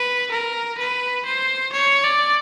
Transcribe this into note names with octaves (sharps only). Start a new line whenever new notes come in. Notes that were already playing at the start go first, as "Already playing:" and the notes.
Already playing: B4
A#4
B4
C5
C#5
D5